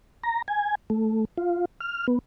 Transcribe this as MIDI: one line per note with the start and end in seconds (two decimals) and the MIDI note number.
0.23 0.42 82
0.48 0.75 80
0.90 1.25 57
1.38 1.65 65
1.81 2.07 89
2.07 2.19 59